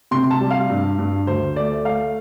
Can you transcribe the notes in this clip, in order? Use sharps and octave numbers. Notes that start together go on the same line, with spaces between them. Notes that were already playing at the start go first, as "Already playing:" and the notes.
C3 C6
A5
G3
F5
G2
G2
D2 C5
A3 D5
A3 F5